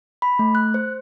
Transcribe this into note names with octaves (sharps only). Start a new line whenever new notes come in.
B5
A3
F#6
C5